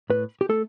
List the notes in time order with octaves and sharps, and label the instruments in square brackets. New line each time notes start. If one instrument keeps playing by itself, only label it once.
[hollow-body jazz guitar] A2 B4
G4
A3 A4